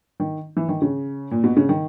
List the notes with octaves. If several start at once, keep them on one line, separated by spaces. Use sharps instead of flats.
D#3
E3
D#3
C#3
A#2
B2
C#3
D#3